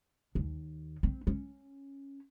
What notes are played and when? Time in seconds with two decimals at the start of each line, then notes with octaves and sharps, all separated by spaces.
0.35 D#2
1.03 C4
1.27 C#4